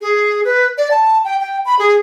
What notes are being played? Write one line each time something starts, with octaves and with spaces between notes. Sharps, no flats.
G#4
B4
D5
A5
G5
G5
B5
G#4